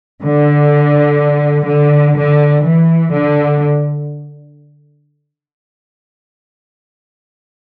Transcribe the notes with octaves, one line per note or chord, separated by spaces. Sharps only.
D3
D3
D3
E3
D3